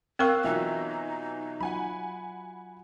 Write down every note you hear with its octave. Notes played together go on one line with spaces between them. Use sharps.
C4 A#4 F5 C#6 E6 F#6
B2 E3 F#3 D#4 F4 F#4 E5
F#3 F4 F#5 G#5 B5